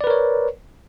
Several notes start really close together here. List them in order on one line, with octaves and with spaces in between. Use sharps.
D5 B4 A#4 C#5